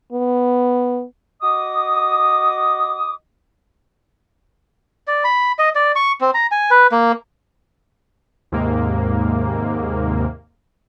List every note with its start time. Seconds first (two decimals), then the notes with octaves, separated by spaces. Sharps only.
0.12 B3
1.41 F#4 D#5 D6 D#6
5.07 D5
5.24 B5
5.59 D#5
5.75 D5
5.96 C#6
6.21 C4
6.34 A#5
6.51 G#5
6.71 B4
6.92 A#3
8.52 D#2 G#2 C3 A#3